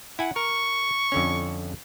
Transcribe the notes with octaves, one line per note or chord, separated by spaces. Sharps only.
E4 F#5 G#5
A#4 C#6
F2 D3 C#4